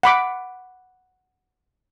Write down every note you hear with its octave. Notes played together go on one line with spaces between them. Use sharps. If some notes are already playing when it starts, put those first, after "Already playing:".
F#5 B5 D6